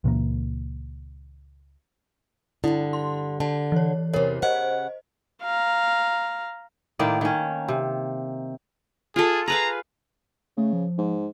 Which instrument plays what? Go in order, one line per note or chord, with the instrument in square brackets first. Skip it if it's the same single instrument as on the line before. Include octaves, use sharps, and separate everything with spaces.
[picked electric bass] C#2 A#2 E3 A#3
[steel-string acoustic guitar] G2 D3 [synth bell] E4
[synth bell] C6
[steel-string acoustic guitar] D3 [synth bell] A5
[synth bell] E3 C#5
[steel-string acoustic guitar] E2 C3 [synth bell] A#4 C#5
[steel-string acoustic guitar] C#3 F#5 [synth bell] C5 D#5
[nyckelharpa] F5 A#5
[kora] A2 D#3 A#3 D5
D#3 C#4
C3
[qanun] F4 A4 [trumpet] G#4
[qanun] G#4 B4 F5 [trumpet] A#5
[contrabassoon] C#3 [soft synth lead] A3
[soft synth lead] F3
[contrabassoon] G#2